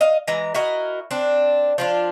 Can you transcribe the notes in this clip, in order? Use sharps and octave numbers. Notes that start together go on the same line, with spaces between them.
D#5 F5
E3 G#3 A#5
E4 F#4 A#4 D#5
C4 D4
F3 D4 F4